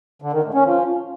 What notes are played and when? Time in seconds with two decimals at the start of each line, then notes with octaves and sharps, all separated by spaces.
0.22 D3
0.33 D#3
0.43 A2
0.54 C#4
0.65 F3